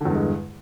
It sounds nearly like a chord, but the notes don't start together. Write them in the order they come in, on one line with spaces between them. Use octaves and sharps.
D3 E2 G2 G#3